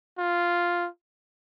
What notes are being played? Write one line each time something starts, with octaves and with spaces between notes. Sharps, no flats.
F4